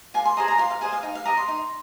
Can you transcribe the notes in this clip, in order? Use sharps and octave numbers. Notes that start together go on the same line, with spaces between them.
F4 G#5
C6
G#4 C5 D#5 A#5
A#5
F4 C6
F5
G#4 C5 D#5 G#5
F5
D#4 F5
F5
A#4 D#5 A#5
C6
D#4